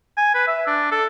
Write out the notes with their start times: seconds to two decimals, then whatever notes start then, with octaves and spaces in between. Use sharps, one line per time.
0.17 G#5
0.35 B4
0.47 E5
0.67 D4
0.92 A4